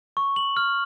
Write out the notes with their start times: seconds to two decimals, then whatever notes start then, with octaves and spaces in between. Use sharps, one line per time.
0.17 C#6
0.36 F#7
0.57 F6